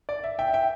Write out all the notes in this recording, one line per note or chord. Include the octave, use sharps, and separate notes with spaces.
D5
E5
E5 G5
E5 G5